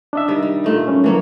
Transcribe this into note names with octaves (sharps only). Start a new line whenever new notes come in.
D4 D#5 E5
D#3 G3
G3
A#2 A3 D#4
G3 C#4
E3 F#3 A3 A#3 C#5